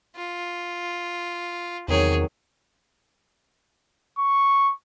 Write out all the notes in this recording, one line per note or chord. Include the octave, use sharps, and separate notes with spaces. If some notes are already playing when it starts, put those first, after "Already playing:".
F4
E2 C3 D#3 F#3 G#4 C#5
C#6